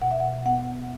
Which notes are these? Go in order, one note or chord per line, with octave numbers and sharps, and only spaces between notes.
B2 F#5
E5
F#5
B3 F#5